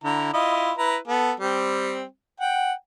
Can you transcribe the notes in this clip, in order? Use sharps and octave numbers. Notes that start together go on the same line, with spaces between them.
D3 E4 A#5
E4 F4 D#5
E4 B4 A#5
B3 A4
G3 C4
F#5 G5